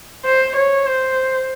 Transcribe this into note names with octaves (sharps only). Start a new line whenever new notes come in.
C5
C#5
C5